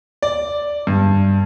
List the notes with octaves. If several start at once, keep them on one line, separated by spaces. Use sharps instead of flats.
D5
G2